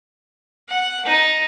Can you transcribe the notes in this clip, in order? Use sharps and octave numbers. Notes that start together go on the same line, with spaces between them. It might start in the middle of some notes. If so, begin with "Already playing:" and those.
F#5
D#4